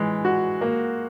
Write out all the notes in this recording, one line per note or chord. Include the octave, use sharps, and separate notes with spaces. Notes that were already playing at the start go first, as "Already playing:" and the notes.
Already playing: E3 G#3
F#4
A#3